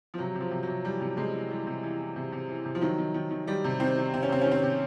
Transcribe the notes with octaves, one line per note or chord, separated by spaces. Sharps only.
F3
C3 F#3
C3
F3
C3
C3 F#3
E3 G3
C3
C3 G#3
E3
E3 G3
C3
E3
E3
C3
C3
E3
C3
F3
D#3 F#3
D#3
D#3
D#3
D#3 G3
C3
D#3 C4
D#3
C3 C4
C#4
C3 C4
D#3 C#4
C4
C3